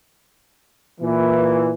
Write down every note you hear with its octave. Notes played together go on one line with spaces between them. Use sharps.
A#2 E3